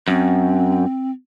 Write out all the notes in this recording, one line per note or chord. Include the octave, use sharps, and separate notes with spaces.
F#2 C4